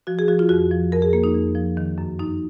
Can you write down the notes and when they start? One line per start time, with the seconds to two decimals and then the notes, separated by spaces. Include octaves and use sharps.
0.07 F3 F#4
0.19 G#4
0.28 F3 F#4
0.39 F4
0.49 F2 F#4
0.71 F3
0.92 F2 A#4
1.02 G#4
1.13 F2 A#3
1.24 D#4
1.35 F2
1.55 F3
1.77 D#3
1.98 F#2
2.19 F#2 D#4